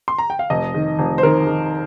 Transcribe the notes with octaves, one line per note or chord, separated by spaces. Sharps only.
C6
A#5
G5
F5
F1 D#5
D#3
F1
C5
D#3 A#4
D#3